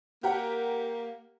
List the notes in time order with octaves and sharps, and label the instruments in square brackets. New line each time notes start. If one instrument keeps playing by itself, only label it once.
[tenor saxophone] A#3 [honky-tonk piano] G4 A#4 F#5